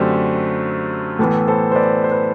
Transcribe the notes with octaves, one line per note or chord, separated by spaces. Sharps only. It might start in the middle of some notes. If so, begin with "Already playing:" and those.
Already playing: F#2 D3 A3 C4 G4
A2 E3 B3 A4
A4 C5
C5
B4 D5
C5
B4